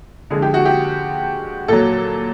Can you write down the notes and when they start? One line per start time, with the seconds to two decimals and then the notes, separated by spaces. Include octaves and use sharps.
0.30 D3 F3 G#3 G#4
0.42 G4
0.54 F#4
0.65 G4
1.68 A#2 F#3 A4